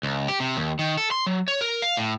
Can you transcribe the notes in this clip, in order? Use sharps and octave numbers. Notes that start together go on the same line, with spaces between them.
C#2
G4
C3
D#2
D#3
A4
C6
F#3
C#5
A#4
F5
A2